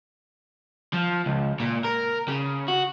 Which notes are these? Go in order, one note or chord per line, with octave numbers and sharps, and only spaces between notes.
F3
C#2
A#2
A#4
C#3
F#4